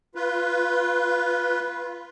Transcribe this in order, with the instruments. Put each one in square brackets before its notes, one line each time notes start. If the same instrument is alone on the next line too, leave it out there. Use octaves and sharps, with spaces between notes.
[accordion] F4 B4